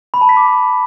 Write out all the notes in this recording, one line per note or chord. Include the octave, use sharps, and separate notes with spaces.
B5
A5
B6
D6